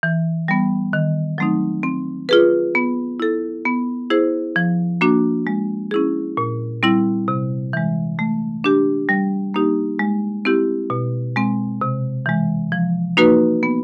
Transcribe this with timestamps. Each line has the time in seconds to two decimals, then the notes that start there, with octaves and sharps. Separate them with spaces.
0.03 E3
0.48 G3 B3
0.93 D#3
1.38 F#3 A3 C4 D#4
1.83 C4
2.29 F4 G#4 B4
2.75 B3
3.20 E4 A4
3.65 B3
4.10 E4 G#4 C5
4.56 F3
5.01 A#3 D4 F#4
5.47 G#3
5.91 C#4 E4 G#4
6.37 A#2
6.83 G3 C4 E4
7.28 C3
7.73 E3 G#3
8.19 A3
8.64 D4 G4
9.09 G3
9.54 A#3 D#4 G4
9.99 G#3
10.45 C4 E4 G4
10.90 B2
11.36 G#3 C4
11.81 C3
12.26 E3 G#3
12.72 F3
13.17 A#3 D#4 F#4 B4
13.63 B3